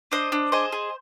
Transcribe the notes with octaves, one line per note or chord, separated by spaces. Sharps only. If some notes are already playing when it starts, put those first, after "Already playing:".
D4 C5 D#5
D4
G#4 C5 D#5
G#4